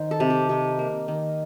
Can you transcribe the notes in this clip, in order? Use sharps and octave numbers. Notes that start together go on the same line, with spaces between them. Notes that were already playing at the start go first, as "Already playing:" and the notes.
Already playing: D#3 C5
A4
C3
G4
C3 D#4
A#3
D#3